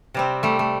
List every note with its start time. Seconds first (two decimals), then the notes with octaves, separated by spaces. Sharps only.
0.14 C3 G3 C4
0.43 G3 A3
0.59 A3